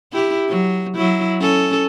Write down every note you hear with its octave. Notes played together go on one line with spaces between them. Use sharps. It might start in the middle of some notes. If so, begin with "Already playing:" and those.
E4 G4
F#3
F#3 E4
C#4 A4